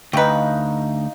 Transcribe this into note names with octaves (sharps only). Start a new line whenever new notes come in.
D2 D#4 G4 B4 F5 C#6